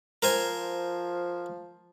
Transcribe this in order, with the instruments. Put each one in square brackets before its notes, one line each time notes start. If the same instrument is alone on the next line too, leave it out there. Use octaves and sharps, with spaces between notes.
[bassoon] F3 [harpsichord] A#4 C5 G#5